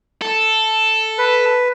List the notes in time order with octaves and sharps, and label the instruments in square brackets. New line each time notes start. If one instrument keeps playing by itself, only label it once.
[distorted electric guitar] A4
[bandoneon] B4